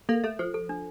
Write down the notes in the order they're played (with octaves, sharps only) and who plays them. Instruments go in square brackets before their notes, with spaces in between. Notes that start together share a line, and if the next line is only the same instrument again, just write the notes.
[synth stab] A#3 [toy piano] A4
[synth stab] A3 [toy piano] A4
[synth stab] F3 [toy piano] C5
[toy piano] A4
D4